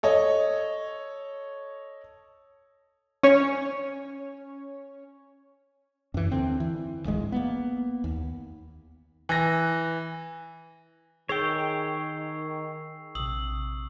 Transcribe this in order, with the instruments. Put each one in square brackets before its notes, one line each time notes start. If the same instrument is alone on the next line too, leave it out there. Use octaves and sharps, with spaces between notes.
[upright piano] A4 C#5 D#5
[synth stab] C#4 C#5
[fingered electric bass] F#2 E3
D#2 D3 C4
E3
D1 G#1 G#3
A#3 B3
D#2
[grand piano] E3 A#6
[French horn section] D#3 [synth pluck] G#4 [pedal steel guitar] C#5 G5 [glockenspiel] C#6 E6 C7
[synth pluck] A#1 C3 [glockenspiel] D#6 E6 F#7